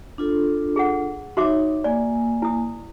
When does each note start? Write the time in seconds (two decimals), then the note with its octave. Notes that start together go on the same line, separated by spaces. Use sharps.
0.18 D4 F4 A4
0.76 G#4 F#5
1.37 D#4 F#4 C#5 E5 D6
1.84 A#3 D5 G#5
2.42 E4 D#6